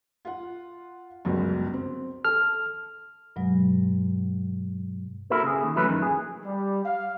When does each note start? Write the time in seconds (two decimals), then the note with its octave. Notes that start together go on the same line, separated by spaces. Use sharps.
0.25 F4 F#5
1.25 G1 C#2 F#2
1.73 C4
2.25 A4 F6
3.36 G2 B2 F#3 G#3
5.30 A#3 E4 F#4 A4 A#4
5.43 C#3 G#4
5.63 D#2
5.76 E3 F#3 A3 C#4 B4
5.89 F#2 A#2 D#3
6.02 G#4
6.45 G3
6.86 F5